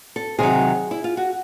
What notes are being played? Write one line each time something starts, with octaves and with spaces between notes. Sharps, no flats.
A4
C3 D#3 F#3 G#4
E4
F4
F#4